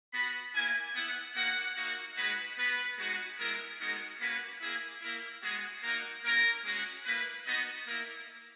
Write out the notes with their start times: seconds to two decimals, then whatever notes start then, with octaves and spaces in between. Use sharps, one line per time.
0.13 B3 F#4 B5
0.54 A#3 E4 G#5
0.95 B3 E4 F#5
1.36 A#3 D#4 F#4 F#5
1.76 A#3 D#4 F#4
2.17 G#3 D#4 F#4 B4
2.58 B3 F#4 B4
2.99 G#3 D#4 F#4
3.39 G#3 B3 E4 A#4
3.80 G#3 B3 D#4 F#4 A#4
4.21 A#3 C#4 F#4 B4
4.61 A#3 E4 G#4
5.02 A#3 E4 A#4
5.43 G#3 B3 F#4 G#4
5.83 A#3 D#4 F#4 A#4
6.24 A#3 C#4 E4 A#4
6.65 G#3 C#4 F#4
7.05 A#3 E4 B4
7.46 B3 D#4 F#4 D#5
7.87 A#3 E4 A#4